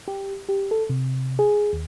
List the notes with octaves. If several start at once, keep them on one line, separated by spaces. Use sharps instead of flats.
G4
G4
A4
C3
G#4
D#2